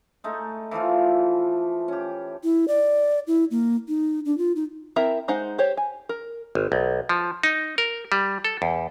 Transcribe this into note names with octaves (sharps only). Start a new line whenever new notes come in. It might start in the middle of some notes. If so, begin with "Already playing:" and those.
G#3 A3 D#4
E3 F3 A3 F4
C#4 G4
E4
D5
E4
A#3
D#4
D4
F4
D#4
C4 E4 A#4 E5 A#5
G#3 D#4 C5 F#5
G4 C5 C#5
G#5
A#4
G#1
B1
F3
D#4
A#4
G3
A4
E2